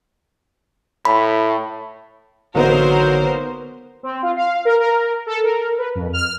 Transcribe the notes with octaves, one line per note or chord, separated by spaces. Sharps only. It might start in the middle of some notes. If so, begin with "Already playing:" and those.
A2 B5
A1 D3 F#3 A#3 B3 D#4 A#4 C5
C4
F4
F5
A#4
A#4
A4
A#4
B4
F2
F6